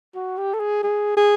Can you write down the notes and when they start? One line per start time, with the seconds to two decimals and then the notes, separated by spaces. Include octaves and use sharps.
0.15 F#4
0.38 G4
0.54 A4
0.60 G#4
0.83 G#4
1.17 G#4